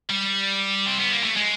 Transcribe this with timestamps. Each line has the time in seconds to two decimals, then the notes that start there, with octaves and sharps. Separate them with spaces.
0.10 G3
0.87 C4
0.99 B3
1.12 A#3
1.24 A3
1.37 G#3